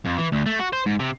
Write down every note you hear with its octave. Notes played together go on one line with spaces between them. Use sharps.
F2
E3
D2
A3
F#4
C5
G#2
C3